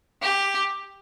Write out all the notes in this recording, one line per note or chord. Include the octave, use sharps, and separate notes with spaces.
G4